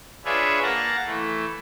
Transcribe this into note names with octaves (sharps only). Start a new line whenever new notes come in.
D4 F4 G#4 B4 C#5 E5
A#3 F#5 A5 A#5
E3 A3